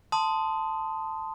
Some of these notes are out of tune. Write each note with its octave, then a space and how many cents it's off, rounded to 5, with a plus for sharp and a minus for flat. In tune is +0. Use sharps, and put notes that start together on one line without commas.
A5 +5 C6 -15 D#6 +0